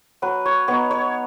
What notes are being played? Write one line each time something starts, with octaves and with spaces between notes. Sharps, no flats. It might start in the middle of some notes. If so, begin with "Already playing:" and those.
F#3 B4
C#5
B3 D#4 C#5
C#5